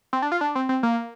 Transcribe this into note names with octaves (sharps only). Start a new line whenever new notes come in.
C4
D4
F4
D4
C4
C4
A#3